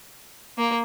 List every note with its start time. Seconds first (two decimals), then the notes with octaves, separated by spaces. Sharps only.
0.58 A#3